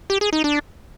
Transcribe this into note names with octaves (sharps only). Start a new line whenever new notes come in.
G4
G#4
D#4
D4